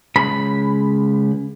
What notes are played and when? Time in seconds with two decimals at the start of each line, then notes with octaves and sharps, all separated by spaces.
0.16 C#2 B5